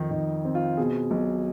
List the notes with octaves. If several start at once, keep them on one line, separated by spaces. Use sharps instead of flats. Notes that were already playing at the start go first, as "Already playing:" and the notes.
Already playing: F2 D#3 D#4
D#3 D#4
C4
F4
B2 G#4
B1